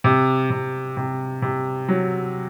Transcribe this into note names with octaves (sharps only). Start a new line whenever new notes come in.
C3
C3
C3
C3
F#3